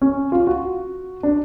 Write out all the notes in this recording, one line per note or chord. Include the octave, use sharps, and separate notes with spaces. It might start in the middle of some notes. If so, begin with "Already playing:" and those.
C#4
F4
F#4
D4